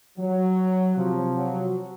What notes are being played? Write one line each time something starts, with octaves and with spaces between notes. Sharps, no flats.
F#3
C3 F3
F#3